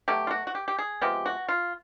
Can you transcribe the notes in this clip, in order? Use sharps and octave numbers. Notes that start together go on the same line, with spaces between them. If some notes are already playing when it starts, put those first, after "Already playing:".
B2 F#3 A3 G4
F4
F#4
F#4
G4
G4
G#4
C3 F3 G#3 B3 G4
F#4
F4